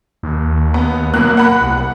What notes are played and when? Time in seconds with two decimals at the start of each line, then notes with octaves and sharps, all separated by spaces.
0.23 D#2
0.74 B3
1.14 B2 F#3 A#3 F#6
1.37 F#5 B5
1.61 C2